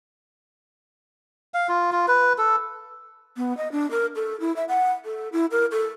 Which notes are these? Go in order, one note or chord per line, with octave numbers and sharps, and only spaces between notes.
F5
F4
F4
B4
A4
B3
D#5
D4
A#4
A4
E4
E5
F#5
A4
E4
A#4
A4